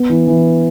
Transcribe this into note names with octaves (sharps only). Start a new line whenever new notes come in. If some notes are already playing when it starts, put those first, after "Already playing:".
Already playing: B3
E3
E3